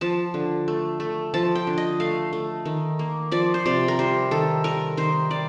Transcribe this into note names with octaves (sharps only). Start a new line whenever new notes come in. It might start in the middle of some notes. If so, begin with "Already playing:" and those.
F3 A5
D3
A3
A3
F3 A5
G5
D3
D#5
A3 F5
A3
D#3
A#3
F3 D5
C5
C3 D5
A#4
G3 C5
D#3 A4
G3 A#4
D#3 C5
G3 D5